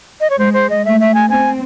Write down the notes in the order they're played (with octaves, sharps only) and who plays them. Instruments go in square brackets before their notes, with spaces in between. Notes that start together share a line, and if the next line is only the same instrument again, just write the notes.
[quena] D#5
C#5
[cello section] G#3 [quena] C5
[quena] C5
D#5
[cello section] A3 [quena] E5
[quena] E5
G#5
[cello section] C4 [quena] G#5